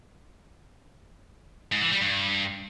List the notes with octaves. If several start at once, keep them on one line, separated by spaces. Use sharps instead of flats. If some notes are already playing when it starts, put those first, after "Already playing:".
G#2
E3
G3
G2